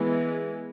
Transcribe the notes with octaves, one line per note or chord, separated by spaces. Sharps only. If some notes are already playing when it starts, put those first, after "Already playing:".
Already playing: E3 G#3 B3